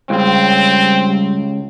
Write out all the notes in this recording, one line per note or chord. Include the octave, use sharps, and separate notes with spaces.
C#2 G3 C4